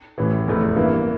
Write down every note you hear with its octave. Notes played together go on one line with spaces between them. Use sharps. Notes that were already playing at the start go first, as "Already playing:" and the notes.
A1 A2 E3
F1 E2 E3 A3
G2 E3 A#3 E4